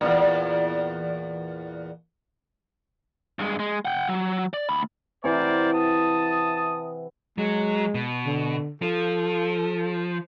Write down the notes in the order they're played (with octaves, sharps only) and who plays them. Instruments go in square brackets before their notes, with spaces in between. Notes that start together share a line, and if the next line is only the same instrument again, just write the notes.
[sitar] E2 G2 A#2
[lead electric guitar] G2 G#3
G#3
F#5 G5
F#3
D5
D2 B5
[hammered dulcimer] C3 E3 F#5 [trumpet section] A#4 C5 D5
[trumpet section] A5 D#6
[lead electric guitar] F#3 [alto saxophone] G#3
[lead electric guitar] B2
[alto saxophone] D3
[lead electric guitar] F3 [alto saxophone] A4